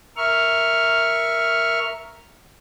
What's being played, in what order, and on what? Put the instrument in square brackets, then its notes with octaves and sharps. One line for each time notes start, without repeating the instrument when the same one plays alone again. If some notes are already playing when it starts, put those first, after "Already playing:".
[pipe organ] A#4 E5 C#6 F6